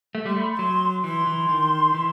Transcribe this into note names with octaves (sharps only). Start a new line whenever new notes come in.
A3
G3 C6
A3 B5
C6
F#3
E3 C6
E3
D#3
E3